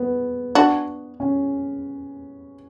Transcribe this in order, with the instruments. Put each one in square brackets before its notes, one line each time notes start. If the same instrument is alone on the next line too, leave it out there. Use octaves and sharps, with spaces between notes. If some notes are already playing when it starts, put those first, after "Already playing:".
Already playing: [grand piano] B3
[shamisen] D4 F#4
[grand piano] C#4